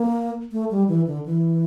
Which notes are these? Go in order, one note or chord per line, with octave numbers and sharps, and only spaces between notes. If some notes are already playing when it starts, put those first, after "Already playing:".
Already playing: A#3
A3
G3
E3
D3
E3